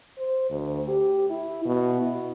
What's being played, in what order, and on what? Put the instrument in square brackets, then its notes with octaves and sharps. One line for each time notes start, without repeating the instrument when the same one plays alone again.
[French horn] C5
D2
G4
E4
B2
E4